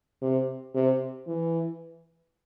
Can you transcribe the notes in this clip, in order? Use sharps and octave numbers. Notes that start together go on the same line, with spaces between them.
C3
C3
E3